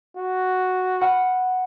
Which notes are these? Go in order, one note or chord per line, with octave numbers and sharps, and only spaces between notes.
F#4
F#5 B5 F6